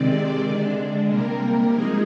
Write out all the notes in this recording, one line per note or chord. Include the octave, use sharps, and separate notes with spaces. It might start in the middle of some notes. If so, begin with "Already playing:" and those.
Already playing: C3 D#3 G#3 C4 D5
D3 G#3 D4
C3 G3 A#3 A#4
F3 G#3 D#4 G#4